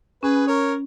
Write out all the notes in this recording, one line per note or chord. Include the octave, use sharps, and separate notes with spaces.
C#4 G#4 B4
A#4 C#5